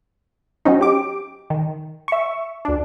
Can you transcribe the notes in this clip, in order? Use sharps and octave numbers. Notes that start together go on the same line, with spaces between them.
F#3 C4 C#4 D#4
G4 D6
D#3
E5 C#6
D2 D4